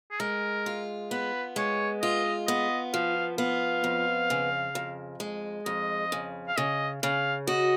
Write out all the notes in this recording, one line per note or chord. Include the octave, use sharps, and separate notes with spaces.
G#4
G#3 A#4
F4
B3 B4
G#3 C#5
F4 D#5
B3 D#5
F3 F5
B3 F5
F2
C#3
F2
G#3
F2 D#5
C#3
F5
C#3 D#5
C#3 F5
F#4 D#5